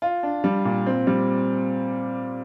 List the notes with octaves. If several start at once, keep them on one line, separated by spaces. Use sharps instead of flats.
F4
D4
G3
A#2
C4
G3